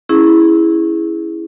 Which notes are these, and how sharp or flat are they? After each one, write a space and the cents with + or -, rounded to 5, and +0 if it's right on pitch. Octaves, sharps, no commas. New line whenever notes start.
C#4 +0 E4 -5 G#4 +0